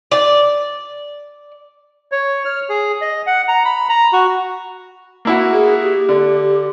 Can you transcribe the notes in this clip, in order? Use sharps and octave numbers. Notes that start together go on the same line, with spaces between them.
D5
C#5
F6
G#4
D#5
F#5
A#5
B5
A#5
F#4
A#3 E4 F#4
G#4
G4
D3